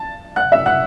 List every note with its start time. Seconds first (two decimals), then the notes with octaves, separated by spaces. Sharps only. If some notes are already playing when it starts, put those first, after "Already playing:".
Already playing: A5 A6
0.36 F#5 F#6
0.52 E5 E6
0.66 F#5 F#6